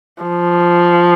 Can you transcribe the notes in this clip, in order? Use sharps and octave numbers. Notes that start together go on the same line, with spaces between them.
F3